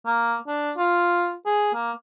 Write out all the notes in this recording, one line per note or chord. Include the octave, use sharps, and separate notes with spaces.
A#3
D4
F4
G#4
A#3